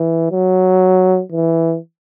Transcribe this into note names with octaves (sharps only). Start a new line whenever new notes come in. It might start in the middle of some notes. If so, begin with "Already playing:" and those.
Already playing: E3
F#3
E3